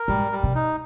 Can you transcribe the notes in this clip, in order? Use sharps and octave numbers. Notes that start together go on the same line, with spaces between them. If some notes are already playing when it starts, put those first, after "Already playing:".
Already playing: A#4
G#2 G3
G3
C3
D#4